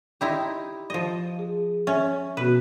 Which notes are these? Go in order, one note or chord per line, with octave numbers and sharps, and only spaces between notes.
D#4 E4 G4 G5 C6
F3 D#5
G#4
C#4 E5 C#6
B2 B3 F#4 B4